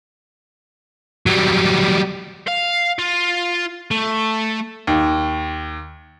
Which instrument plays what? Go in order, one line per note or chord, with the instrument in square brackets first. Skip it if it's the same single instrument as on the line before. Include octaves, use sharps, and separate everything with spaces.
[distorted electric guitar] F#3 G3
F5
F4
A3
[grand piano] D#2